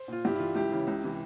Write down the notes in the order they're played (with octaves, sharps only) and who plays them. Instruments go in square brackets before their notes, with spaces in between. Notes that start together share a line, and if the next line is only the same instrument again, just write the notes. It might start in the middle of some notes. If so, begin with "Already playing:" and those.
Already playing: [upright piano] C5
A#2 F4
G2 E4 G4
E4
E3 F4
C#2 E4 G4
C#3 E3
C#2
C3 E3